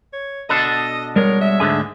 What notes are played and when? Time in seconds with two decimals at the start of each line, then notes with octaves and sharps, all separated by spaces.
0.13 C#5
0.49 B2 D4 A4 D#5
1.16 G3 G#3 A#4 C#5
1.41 E5
1.60 D2 G#2 D3 D4 G#4 G#5